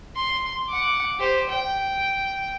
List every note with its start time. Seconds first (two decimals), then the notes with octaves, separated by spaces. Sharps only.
0.15 C6
0.68 F#5 D6
1.19 G4 C5
1.49 G5